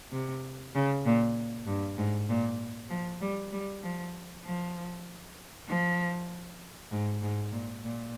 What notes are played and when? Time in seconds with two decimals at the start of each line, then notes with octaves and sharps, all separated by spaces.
0.12 C3
0.75 C#3
1.05 A#2
1.67 G2
1.98 G#2
2.29 A#2
2.90 F3
3.21 G3
3.52 G3
3.82 F3
4.44 F3
5.68 F3
6.91 G#2
7.22 G#2
7.52 A#2
7.84 A#2